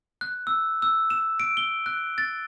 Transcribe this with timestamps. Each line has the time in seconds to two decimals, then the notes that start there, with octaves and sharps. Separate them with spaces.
0.21 F#6
0.47 E6
0.82 E6
1.10 E7
1.40 D7
1.57 G7
1.86 F#6
2.18 A6